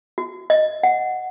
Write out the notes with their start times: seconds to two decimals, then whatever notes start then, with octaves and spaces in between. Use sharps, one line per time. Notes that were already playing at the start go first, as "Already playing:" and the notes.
0.18 F#4
0.50 D#5
0.83 F#5